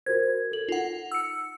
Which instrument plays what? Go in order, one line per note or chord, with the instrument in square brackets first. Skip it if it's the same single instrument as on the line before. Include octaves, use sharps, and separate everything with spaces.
[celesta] F#4 A#4 C5 [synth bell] G#6
[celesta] A4 F#7
[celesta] D#4 [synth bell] F4 F#5
[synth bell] E6 C#7